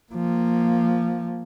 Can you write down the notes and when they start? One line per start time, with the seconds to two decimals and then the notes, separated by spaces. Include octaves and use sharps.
0.13 F3 A#3